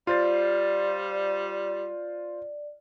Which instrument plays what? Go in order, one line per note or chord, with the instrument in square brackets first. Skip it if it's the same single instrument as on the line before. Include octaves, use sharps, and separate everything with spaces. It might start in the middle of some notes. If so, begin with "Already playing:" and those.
[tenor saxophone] G3 [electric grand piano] F4 C5 A6 [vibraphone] D5